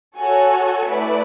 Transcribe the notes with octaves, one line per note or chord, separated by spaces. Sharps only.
F#4 A4 C#5 G#5
A3 E4 B4 D5